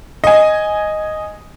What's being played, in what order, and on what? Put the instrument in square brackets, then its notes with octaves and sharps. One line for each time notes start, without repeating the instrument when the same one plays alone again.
[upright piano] D#5 G#5